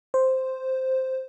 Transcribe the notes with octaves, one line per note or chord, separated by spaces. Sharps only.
C5